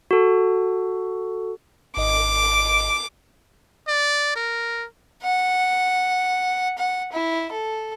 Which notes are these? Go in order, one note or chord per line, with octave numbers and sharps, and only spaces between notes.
F#4 A4
G#1 D#5 D6
D5
A#4
F#5
F#5
E4
A4